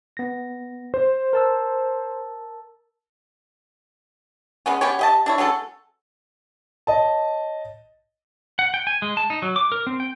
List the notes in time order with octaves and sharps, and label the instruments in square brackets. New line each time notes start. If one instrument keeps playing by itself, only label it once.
[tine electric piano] B3 A#6
[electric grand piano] C5
[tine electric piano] A#4 A5 E6
[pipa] G#3 B3 C#4
B3 C#4 G4 C#5
G4 D#5 A5
D4 E4 C#5
F#3 G#3 C#4 A4
[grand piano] C#5 D#5 A5
[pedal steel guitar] F#5
G5
G#5
G#3
A5
D#4
F#3
D6
A#4
C4
G5